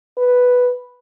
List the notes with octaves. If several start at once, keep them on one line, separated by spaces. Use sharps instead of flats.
B4